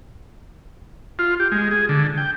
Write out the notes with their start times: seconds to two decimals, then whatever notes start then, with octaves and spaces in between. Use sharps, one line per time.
1.19 F4
1.40 G4
1.52 G#3
1.71 G#4
1.89 D3
2.17 G5